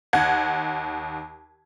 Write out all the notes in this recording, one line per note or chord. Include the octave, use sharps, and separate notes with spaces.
D#2 F#5 G#6